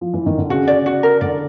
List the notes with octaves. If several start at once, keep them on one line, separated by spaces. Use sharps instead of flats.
F3
E3
D#3
D3
C#3 F#4
D5
F#4
A#4
D3 D5